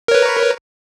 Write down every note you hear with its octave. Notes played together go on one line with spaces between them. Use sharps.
A#4 B4 C#5